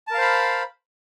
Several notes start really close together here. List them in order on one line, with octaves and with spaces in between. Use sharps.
A5 A#4 F5 C5 B5